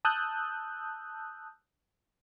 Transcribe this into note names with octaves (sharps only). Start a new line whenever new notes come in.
A5 D#6 E6 F#6 G6